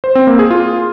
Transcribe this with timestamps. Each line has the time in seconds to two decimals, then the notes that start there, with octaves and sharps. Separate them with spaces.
0.04 C5
0.15 C4
0.27 A#3
0.39 G#4
0.51 F4